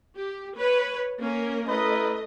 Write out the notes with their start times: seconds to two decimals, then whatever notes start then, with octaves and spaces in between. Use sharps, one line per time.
0.16 G4
0.57 B4 C#5
1.20 A#3 C#4 A#4
1.69 A3 E4 A#4 B4 D#5